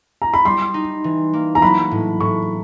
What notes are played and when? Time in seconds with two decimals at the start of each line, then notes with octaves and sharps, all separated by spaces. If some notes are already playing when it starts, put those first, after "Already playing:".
0.22 A#5
0.34 B5
0.45 G3 C6
0.74 D#4
1.04 E3
1.33 A#3
1.55 A#5
1.62 F#3 B5
1.91 A2
2.20 A2 C#6